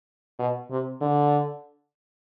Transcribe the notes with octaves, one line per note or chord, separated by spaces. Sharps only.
B2
C3
D3